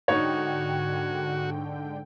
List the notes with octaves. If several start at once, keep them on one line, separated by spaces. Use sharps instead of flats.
G#2 D3 D#4 F#4 C#5 G5